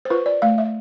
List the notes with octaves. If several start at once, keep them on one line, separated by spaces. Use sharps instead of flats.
C5
F4 B4
D5
A3 F5
E5